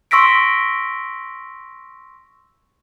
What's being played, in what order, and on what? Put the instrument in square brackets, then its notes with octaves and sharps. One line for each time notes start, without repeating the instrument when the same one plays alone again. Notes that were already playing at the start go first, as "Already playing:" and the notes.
[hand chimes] C6 C#6 E6 A#6 B6 D7